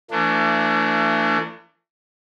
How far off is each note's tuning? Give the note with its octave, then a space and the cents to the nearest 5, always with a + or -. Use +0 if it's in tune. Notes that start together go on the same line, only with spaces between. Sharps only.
E3 +40 A3 +35 D4 +0